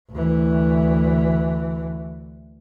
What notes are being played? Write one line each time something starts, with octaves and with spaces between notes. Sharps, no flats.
D2 E3